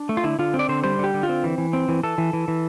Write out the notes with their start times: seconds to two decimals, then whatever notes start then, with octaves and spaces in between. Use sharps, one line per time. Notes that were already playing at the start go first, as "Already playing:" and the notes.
Already playing: D4
0.09 A3
0.17 F4
0.24 D3 E4
0.39 D3 F4
0.54 C4
0.59 D5
0.69 D3 C5
0.84 G3 C5
0.99 D3 G4
1.14 D3
1.23 F4
1.29 C4
1.44 E3
1.58 E3
1.73 C4
1.89 E3
2.03 E3 A4
2.18 E3
2.33 E3
2.48 E3